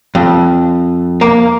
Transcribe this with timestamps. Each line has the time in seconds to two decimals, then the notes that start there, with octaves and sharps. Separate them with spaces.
0.15 F2
1.21 A#3